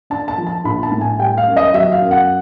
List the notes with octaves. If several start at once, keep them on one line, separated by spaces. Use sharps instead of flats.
D4 A5
A5
F3
A5
A#1 B5
A5
A2
G#5
G3 G5
F5
F#2
D#5
F#3 E5
F5
F#2
F#5